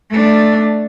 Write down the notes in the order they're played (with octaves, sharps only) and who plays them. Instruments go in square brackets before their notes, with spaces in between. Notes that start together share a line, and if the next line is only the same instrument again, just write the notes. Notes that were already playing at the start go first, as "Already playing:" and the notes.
[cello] A3 D4